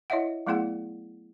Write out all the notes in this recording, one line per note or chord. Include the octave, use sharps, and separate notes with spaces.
E4 C#5 D#5 E5 F#5
F#3 A3 B3 E4 G#4 F#5